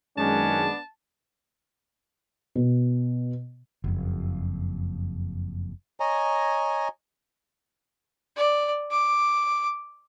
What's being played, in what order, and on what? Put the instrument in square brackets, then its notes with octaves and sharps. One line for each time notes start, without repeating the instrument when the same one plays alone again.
[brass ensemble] F#2 D#3 G#3 [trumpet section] B3 D4 [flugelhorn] C#4 [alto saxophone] A5
[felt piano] B2
[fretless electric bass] F#1 F2
[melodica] C#5 D#5 G#5 A#5
[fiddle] D5
D6